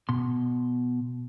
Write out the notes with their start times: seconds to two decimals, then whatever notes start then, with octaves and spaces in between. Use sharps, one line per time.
0.09 B2 C6